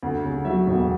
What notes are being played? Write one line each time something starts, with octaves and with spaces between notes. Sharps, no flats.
D2
C#3
F#3 E5
E1